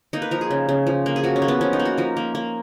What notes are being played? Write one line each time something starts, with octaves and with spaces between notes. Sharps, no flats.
A#3 D#4
B4
F3 A#4
G#4
C#3
C#3
F3
A#3
G#4
F3 F#4
C#4
A#3
B3
F3 C#4
D#4
A#3
F#4
F3 A#4
A#3
A#3